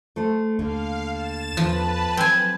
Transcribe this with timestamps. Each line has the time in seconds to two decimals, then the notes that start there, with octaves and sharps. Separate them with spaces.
0.16 A3 A4 C5
0.59 D#2 D3 F5
1.12 A6 E7
1.57 E2 F3 B4 A5
2.17 F#3 C4 G#5